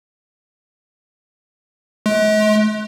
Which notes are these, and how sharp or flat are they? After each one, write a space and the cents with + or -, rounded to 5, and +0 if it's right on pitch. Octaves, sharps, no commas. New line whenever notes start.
G#3 +45